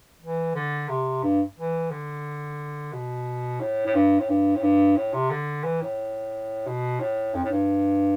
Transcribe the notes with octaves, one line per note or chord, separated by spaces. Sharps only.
E3
D3
C3
G2
E3
D3
B2
A2
A2
G2
A2
G2
A2
G2
A2
C3
D3
E3
A2
B2
A2
F2
A2
G2